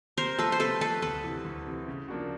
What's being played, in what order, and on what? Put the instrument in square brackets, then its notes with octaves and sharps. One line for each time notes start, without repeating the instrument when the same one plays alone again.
[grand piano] C3 [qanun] A#4 C5
[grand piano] F3 A3 [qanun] A4 B4
[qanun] C5
[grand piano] C3 [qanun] A4 B4
[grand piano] F3 A3 [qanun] A4 B4
[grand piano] D2 [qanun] A4 B4
[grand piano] C3 E3
D2
C3 E3
C#3
F3 A#3 D4 F#4